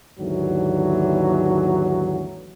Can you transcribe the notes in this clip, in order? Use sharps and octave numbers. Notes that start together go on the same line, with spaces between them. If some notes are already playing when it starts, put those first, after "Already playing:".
D#2 G#2 D3 E3 F#3